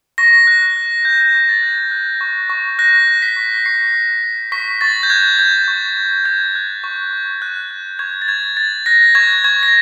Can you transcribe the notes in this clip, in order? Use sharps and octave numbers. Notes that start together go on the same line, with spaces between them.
C#6 A#6
F#6
F#6
C#6 G6
C#6
A6
F#6
F#6
C#6
C#6
F#6 A#6
F#6
B6
C#6
C#6 C7
F#6
F#6
C#6 B6
C#6 A6
G6
F#6 G#6
F#6 G6
C#6
C#6
F#6 G#6
F#6
C#6
C#6
F#6
F#6
C#6 G#6
A6
C#6 G#6
F#6 A6
F#6 A#6
C#6 G#6
C#6 G#6
A#6